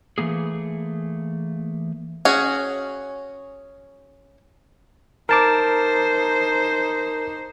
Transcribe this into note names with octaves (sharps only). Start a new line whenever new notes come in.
E3 A3 A#3 G#4
C#4 F#4 G#4
D#4 A#4 C5 A5 D6